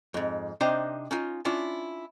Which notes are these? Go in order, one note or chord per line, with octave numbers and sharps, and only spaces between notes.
F2 G#2
C3 D4 D#4 C5 G5 A#5
C#4 D#4 F4
C#4 D4 E4 F4